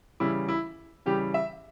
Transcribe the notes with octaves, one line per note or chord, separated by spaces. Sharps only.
C#3 E3 G3 E4
E4
C#3 E3 G3 G4
E5